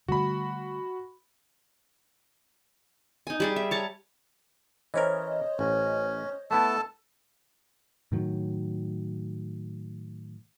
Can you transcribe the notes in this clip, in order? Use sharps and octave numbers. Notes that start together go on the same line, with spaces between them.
D3 G3 A3 F#4 B5
D#4 G#5
G3 G#4 D5
E5
C#5 A5 A#5
E3 C#4 A#4 C5 C#5 D#5
A1 C#4
A3 B3 E4 A4 A5
A2 D#3 F#3